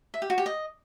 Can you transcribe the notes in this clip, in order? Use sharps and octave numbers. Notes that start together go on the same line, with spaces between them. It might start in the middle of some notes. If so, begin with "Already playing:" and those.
E5
G4
F#4
G4
D#5